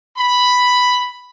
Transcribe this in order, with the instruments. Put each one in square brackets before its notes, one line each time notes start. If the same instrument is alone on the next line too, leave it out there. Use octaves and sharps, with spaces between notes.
[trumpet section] B5